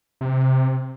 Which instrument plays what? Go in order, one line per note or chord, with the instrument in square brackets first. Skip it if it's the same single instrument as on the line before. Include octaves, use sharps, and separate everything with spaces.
[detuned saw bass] C3